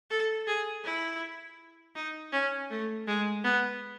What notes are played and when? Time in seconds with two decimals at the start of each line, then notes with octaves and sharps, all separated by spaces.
0.10 A4
0.47 G#4
0.84 E4
1.95 D#4
2.33 C#4
2.70 A3
3.07 G#3
3.44 B3